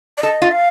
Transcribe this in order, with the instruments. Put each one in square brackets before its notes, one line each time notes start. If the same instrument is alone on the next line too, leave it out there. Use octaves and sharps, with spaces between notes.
[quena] D5
[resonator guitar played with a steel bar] A4 [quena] D#5
[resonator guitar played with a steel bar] F4
[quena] F5